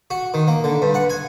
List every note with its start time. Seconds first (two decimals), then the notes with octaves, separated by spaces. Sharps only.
0.10 F#4
0.34 D#3
0.48 A#3
0.64 D3
0.82 G2
0.94 F#5
1.10 G#5